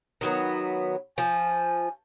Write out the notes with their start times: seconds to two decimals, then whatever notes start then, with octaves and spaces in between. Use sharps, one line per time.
0.21 D#3 F#3 B3
1.18 F3 G#5